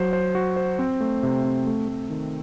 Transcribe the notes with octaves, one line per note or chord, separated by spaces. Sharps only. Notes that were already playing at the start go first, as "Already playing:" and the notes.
Already playing: F#3 C5
C5
F#4
C5
C4
A3
C3
C4
A3
A3
D#3